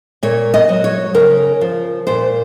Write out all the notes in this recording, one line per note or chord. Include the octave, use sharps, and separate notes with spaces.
A#2 C#5
D#5
F#3
C#5
C#3 A#4
F3
A#2 C5